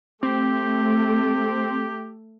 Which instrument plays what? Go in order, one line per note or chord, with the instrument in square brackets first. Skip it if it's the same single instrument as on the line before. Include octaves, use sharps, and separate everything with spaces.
[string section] A3 [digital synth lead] C4 [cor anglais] G4